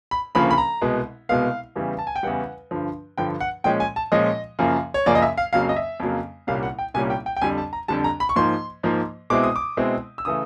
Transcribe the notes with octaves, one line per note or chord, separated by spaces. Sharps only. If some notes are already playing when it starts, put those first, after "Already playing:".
B5
D2 C#3 F3 A#3 B5
B5
A#5
C2 B2 G#3 B3
C2 B2 G#3 B3 F5
E2 C#3 E3 G3
A5
G#5
G5
E2 C#3 E3 G3 F#5
G2 D3 F3
G2 D3 F3 G5
F#5
A#2 F3 G#3 C#4 G5
G#5
A5
A#2 F3 G#3 C#4 D#5
F#2 C#3 F3 A#3
C#5
F#2 C#3 F3 A#3 D5
D#5
E5
F5
F2 C#3 F#3 A#3 F5
D#5
E5
F2 C#3 F#3 A#3
C2 A#2 G3 A#3 C#4 F5
F#5
G5
C2 A#2 G3 A#3 C#4 G#5
G5
G5
G5
F2 D3 G3 G#5
A5
A#5
F2 D3 G3 A5
A#5
B5
C#6
G#2 F3 A#3 C6
G#2 F3 A#3
B2 G#3 C4 E4 D6
D#6
D6
B2 G#3 C4 E4
E6
C#3 E3 A3 D#6